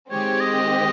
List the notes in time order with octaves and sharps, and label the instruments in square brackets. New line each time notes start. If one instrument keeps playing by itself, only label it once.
[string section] D#3 G#3 C4 G4 [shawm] C#5
[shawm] D#5